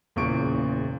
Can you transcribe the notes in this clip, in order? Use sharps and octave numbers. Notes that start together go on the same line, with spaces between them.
F#1 E2 A#2 C#3 C#6 D7